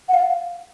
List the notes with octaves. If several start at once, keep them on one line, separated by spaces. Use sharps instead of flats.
F#5
F5